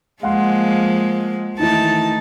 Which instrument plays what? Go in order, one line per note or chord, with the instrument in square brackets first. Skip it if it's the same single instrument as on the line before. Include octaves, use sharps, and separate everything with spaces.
[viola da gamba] F3 G#3 A#3 [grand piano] F5 F#5 C6
[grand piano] D#3 E3 E4 [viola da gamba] A3 D#4 [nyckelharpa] A5